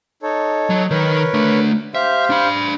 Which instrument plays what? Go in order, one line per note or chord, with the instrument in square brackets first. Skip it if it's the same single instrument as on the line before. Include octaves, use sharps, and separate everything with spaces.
[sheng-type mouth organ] D#4 A4 C#5
[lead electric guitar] F#3
[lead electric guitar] D#3 [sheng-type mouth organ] A#4 B4 C#5
[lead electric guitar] A3 D4
[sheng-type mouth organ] G4 C5 F5 [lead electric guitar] E5
[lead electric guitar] D4 B5